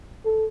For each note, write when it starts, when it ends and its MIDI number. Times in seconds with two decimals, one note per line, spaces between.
0.25 0.45 69